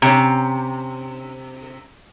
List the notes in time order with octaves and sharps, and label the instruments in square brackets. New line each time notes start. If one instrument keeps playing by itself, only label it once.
[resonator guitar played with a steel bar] C3 [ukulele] C#4 C#5 A#5